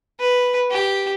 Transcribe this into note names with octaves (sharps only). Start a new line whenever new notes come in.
B4
G4